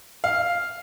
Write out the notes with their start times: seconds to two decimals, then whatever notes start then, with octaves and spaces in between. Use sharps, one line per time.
0.24 F5